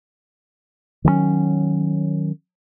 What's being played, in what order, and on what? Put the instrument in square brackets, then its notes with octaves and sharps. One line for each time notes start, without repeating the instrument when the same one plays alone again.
[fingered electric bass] D#3 F#3 G#3 C#4